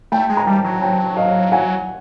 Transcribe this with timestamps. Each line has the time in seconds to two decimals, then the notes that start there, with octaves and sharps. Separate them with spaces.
0.12 A3 G5 A5
0.30 G#3
0.37 A#5
0.47 G3 G5 A5
0.64 F#3
0.81 G5 A5
1.16 D#5 F5
1.52 F#5 G#5